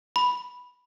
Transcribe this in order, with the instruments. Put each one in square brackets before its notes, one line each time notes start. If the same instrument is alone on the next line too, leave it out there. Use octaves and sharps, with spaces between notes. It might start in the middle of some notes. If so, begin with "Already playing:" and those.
[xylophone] B5